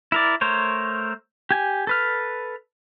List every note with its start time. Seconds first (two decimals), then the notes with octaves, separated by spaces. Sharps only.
0.12 E4 A#4 D5
0.41 A3 A#4 C5 C#5
1.51 G4 G#5
1.87 A4 B4 F6